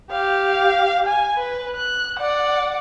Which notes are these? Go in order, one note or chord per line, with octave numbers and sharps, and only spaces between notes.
G4 F5
G#5
B4
F#6
D5 F#5